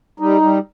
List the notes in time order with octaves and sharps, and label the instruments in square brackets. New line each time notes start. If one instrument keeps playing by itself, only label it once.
[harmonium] G3 D#4
G3